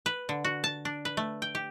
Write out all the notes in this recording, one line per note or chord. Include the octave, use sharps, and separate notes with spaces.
B4
D3
F#4
A5
D4
B4
A3
G5
G4